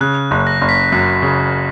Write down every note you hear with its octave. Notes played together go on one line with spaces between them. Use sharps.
C#3 F#6
F#1
A#6
F#1
B6
F#2 B6
C#3